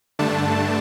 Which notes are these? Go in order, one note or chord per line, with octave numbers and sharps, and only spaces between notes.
G2 D3 A3 D4 A5